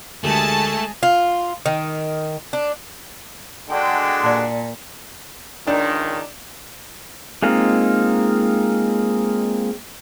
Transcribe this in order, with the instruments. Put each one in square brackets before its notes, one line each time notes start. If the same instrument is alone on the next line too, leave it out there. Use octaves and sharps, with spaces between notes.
[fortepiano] D2 G4 A#4 [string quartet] G#3 G#4 [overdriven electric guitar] A3 [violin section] A5 A6
[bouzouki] F4
D#3
D4
[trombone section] D3 G#3 [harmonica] D4 F#4 [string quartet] G5
[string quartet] A#2 [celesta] D5 A5
[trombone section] C#2 D#3 [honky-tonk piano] D4
[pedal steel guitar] G#3 A#3 C4 D#4 F4